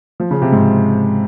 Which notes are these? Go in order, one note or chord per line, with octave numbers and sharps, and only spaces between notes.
F3
C#3
C3
G#2